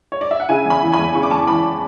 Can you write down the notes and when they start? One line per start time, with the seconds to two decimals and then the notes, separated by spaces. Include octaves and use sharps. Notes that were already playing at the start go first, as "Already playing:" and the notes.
0.12 C#5
0.21 D5
0.31 E5
0.40 F#5
0.49 C#3 E5 G#5
0.65 E2
0.70 G#5 B5
0.82 E3
0.92 G#5 B5
0.99 E2
1.15 C#3 C#6
1.23 D6
1.30 E2 A5 C#6
1.47 E3 B5 D6